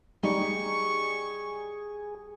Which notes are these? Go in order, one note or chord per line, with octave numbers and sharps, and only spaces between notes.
G3 D#4 G#4 C#6